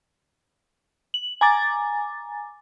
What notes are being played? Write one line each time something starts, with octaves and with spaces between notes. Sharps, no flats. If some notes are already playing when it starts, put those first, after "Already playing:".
F#7
G#5 A#5 D6 A6